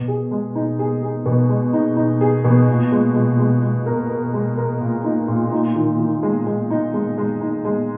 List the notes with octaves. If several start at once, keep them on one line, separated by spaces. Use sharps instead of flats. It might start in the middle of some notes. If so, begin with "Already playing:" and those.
Already playing: B2
G#4
G#3
D#4
G#4
G#4
B2
G#3
D#4
D#4
G#4
B2
A#2
G#3
G#3
G#3
G#3
A#4
A#4
G#3
A#4
A#2
D#4
A#2
D#4
D#3
D#3
G#3
G#3
D#4
G#3
G#3
D#4
G#3